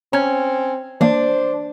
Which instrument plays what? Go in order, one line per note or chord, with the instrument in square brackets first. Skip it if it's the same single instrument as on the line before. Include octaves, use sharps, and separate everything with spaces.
[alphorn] C4 [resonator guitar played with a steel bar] C#4 [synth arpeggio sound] A#5 F6 G#6
[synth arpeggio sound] E3 A#3 D5 [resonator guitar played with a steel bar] D4 [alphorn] C5